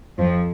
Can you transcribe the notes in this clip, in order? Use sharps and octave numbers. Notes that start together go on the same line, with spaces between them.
F2 F3